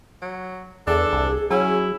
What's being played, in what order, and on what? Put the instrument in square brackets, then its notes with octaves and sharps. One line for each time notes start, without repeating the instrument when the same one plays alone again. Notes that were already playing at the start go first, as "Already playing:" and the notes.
[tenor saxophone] F#3
[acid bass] E2 [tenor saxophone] D4 [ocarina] G#4 [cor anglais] A4
[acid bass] C2
[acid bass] F#3 [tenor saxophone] C#4 [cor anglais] E4